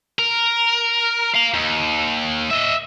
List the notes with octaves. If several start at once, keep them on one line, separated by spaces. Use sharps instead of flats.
A#4
F5 A#5
D#2
D#5 E5